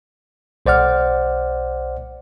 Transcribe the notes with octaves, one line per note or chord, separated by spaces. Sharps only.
B1 C5 D5 F#5 F6